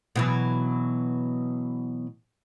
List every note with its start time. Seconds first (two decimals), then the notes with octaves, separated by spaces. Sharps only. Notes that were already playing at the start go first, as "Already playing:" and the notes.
0.16 B2 E3 F#3